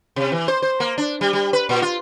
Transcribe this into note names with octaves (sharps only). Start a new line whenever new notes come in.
C3
E3
C5
C5
A#3
D4
G3
G3
B4
A#2
F4